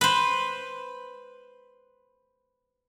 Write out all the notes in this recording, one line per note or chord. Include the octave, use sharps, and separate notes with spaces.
B4 C5